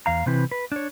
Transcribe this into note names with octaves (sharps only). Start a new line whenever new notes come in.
E2 F5 A#5
C3 E3 C4 E4 B4
B4
D4 C#5